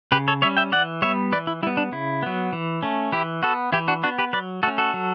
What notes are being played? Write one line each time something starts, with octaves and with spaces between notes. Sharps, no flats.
C#3 G4 B4
A4 C#5
G3 C#4 C#5 E5
E5 G5
E3 D5 F#5
G3 B3 C#5 E5
E3 B4 D5
E4
G3 B3 E4
D4
C#3 E4
F#3 B3
E3
A3 C#4
E3 E4 G4
B3 F#4 A4
E3 E4 G4
D4 F#4
B3 D4 F#4
G4 B4
F#3 B4 D5
A3 C#4 F#4 A4
F#4 A4
F#3